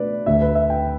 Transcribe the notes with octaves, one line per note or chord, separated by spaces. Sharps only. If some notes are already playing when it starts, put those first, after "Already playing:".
Already playing: B2 A3 D4 B4 D5
D2 D3 A3 E5
B4
E5
G5